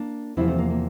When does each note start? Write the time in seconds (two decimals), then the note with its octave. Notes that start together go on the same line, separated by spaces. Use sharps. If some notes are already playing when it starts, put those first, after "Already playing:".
Already playing: A#3 D4
0.37 E2 C3 F3 A3 C4 E4
0.48 A3 C4
0.58 A#3
0.70 A#3